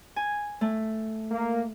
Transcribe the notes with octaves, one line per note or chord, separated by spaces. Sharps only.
G#5
A3
A#3